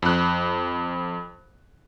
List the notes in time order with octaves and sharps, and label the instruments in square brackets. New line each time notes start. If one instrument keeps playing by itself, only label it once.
[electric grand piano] F2 F#6